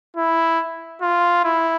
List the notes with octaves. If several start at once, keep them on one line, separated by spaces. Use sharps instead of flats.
E4
F4
E4